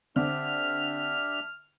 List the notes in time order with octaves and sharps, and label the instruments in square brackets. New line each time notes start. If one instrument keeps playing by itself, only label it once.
[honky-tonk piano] D3 C4 [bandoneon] D4 G4 E5 [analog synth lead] F6